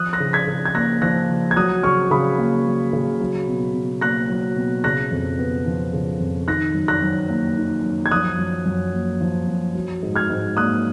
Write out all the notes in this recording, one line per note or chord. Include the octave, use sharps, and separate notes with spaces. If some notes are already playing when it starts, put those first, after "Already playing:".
Already playing: F3 D#6 F#6
F#6 A#6
C#3
G#6 B6
C#3
G#6
A#3 F#6 A#6
F3 F#6 A#6
C#3
G#6
F#3 D#6 F#6
C#3 C#6 F6
C#3 B5 D#6
A#3
F#3
C#3
F#3
B2
B2
A#3 F#6 A#6
F#3
B2
C#3 F#6 A#6
F2
B3
F3
C#3
F2
D#3 F#6 A#6
F#2
F#6 A#6
F#2
A#3
D#3
F#2
G#6
F3 D#6 F#6
F#2
F#2
A#3
F3
F#2
F#3
G#2
F6 G#6
G#2
A#3 D#6 F#6